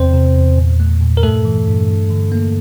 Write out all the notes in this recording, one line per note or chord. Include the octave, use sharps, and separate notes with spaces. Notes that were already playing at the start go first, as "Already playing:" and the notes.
Already playing: E2 C3 C4 C5
C3
E2
A#2
A3
A#2
A#4
G2 A3 A4
E3
G2
G2
D3
A#3